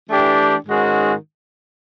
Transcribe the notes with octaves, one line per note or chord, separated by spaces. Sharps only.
E3 A3 D4 G4
G#2 D#3 G#3 C#4 F#4